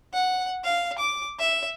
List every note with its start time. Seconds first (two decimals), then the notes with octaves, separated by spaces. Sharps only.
0.13 F#5
0.64 F5
0.98 D6
1.39 E5